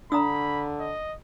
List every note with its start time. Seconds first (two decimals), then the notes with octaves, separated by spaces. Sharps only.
0.12 D3 D4 A#5 B5 D#6 E6
0.80 D#5